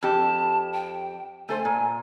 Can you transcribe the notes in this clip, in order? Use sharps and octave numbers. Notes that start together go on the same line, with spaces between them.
F2 G4 A5
G5
A3 A4 C5 G#5
A#2